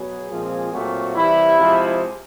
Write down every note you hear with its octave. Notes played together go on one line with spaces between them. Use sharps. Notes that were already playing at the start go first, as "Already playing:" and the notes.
Already playing: B2 F#3 B3 G#4
A#2 F3 G#3 C4
A#2 F#3 A3 C4 F#4
C3 E3 G3 E4
C3 F3 G#3